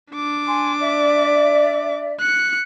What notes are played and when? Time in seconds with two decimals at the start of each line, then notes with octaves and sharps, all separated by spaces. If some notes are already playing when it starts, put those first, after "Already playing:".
0.13 D4 D6
0.46 G#5 C6
0.79 D5 E5
2.20 F#6 C#7